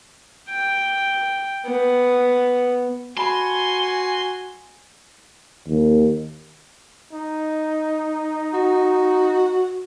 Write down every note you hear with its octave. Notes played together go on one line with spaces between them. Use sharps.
G5
B3
F#4 G#5 A5 B5 C6
D#2
D#4
F#4